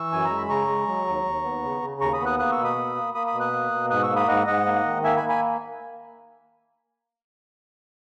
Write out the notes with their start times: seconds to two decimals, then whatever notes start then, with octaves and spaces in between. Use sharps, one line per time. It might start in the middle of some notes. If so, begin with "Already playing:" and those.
Already playing: E3 C#6 E6
0.12 F#2 G#5
0.25 A#5
0.30 G#3
0.37 B5
0.49 C#3 A#5 C#6
0.68 G#3
0.88 F#3
1.07 D#2
1.25 D#2
1.44 B3
1.64 C#3
1.82 C#3
2.01 D#2 A#5 C#6
2.13 B5 D#6
2.20 B3
2.26 D#6 F#6
2.39 A#3 D#6 F#6
2.52 C#6 E6
2.58 B2
2.64 B5 D#6
2.77 A#3
2.96 A#3
3.15 A#3 B5 D#6
3.27 B5 D#6
3.34 B2
3.40 D#6 F#6
3.53 A#3
3.72 B2
3.90 G#2 D#6 F#6
4.03 C#6 E6
4.10 A#3
4.16 B5 D#6
4.28 G#2 D#5 F#5
4.47 G#2 D#5 F#5
4.66 A#3
4.85 D#3
5.04 A#3 E5 G#5
5.17 G#5 B5
5.23 A#3
5.29 G#5 B5